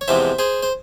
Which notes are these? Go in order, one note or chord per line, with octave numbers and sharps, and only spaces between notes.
C#5
E2 C3 F3 G#3 C5 E5
G#4 C5
C5